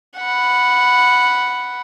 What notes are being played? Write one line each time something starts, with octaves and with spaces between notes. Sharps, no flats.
F#5 B5